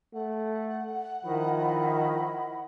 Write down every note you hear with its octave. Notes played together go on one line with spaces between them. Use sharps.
A3 F#5
D#3 F3 E4 D#5 B5